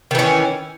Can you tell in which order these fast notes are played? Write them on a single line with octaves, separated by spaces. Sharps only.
D#3 E3 C#4